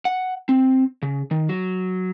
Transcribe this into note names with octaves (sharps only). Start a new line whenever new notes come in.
F#5
C4
C#3
D#3
F#3